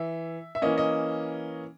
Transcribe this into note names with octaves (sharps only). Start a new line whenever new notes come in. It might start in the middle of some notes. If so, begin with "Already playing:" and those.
Already playing: E3 E5
E5
E3 A#3 C#4 D#5
D#5